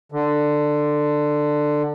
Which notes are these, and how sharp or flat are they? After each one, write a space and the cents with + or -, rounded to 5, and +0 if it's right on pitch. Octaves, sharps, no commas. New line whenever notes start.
D3 +15